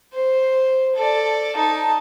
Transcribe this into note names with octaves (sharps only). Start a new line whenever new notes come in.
C5
A4 D5
D#4 A5